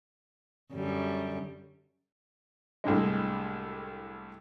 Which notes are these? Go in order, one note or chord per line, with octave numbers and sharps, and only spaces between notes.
F#2 D3 G3
C2 A2 D3 G#3